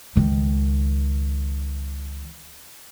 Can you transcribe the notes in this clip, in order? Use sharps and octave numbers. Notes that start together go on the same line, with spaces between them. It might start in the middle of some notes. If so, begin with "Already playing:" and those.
C#2 D#3